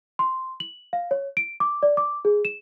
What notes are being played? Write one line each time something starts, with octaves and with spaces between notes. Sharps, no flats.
C6
F#7
F5
C#5
D7
D6
D5
D6
G#4
E7